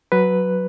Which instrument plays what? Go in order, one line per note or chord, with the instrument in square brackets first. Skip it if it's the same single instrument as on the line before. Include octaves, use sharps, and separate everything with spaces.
[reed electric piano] F#3 B4